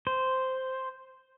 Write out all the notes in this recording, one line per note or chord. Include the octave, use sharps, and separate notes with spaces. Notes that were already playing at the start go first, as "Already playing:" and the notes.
C5